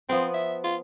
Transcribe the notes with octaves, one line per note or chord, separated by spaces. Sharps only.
F3 B3 C4 B4
E5
F4